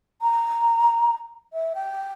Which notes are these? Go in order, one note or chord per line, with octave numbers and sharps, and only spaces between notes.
A#5
E5
G5